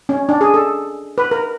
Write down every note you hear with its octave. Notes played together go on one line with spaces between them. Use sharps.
C#4
D4
G#4
A4
B4
A#4